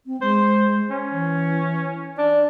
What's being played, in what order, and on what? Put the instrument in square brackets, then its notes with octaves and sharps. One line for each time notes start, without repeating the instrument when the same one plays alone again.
[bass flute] C4
[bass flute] G#3 [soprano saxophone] C5
[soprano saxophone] C#4
[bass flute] E3
[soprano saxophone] D4 [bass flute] D5